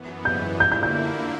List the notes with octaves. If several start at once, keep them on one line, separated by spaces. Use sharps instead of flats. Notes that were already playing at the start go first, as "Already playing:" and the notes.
Already playing: F#2 E3 B3
G6
D3 A#3 E4 G6
G6
G6